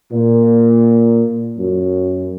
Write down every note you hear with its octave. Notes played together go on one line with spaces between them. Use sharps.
A#2
F#2